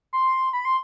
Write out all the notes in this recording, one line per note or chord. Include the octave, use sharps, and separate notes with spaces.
C6
B5
C6